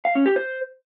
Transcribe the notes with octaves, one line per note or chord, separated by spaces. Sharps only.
F5
C#4
G4
C5